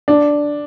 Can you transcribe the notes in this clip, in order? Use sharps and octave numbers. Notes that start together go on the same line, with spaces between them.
D4